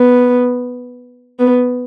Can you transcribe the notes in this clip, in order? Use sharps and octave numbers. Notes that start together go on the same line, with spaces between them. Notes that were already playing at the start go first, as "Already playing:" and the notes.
Already playing: B3
B3